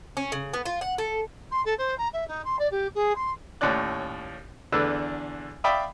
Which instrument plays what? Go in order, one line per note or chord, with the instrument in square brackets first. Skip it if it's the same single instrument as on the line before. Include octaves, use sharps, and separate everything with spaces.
[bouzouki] C#4
C#3
B3
F4
F#5
A4
[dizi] C6
A4
C5
A#5
E5
D#4
C6
D5
G4
G#4
C6
[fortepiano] D#2 A2 C#4 D5 F#6
E2 D3 D4 A4 B4 E6
D5 E5 F5 G5 B5 D#6